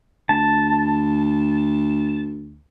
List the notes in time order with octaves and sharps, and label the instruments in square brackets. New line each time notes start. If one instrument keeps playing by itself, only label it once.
[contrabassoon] D2 [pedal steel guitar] A5